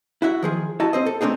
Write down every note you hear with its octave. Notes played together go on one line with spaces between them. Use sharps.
E4 F#4 E5
D#3 F3 G#4
E4 F#4 D#5 A5
C4 C5 D#5
A4
A3 C4 D4 D#4 G#4